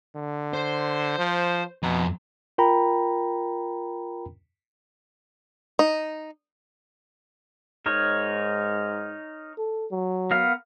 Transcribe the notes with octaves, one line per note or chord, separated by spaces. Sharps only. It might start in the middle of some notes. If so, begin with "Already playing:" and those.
D3
C5
F3
F2 B2 A#5
F4 A#4 G5 A#5 B5
D#4
G#2 D#4 A#4 C#5
A4
F#3
B3 A#4 F5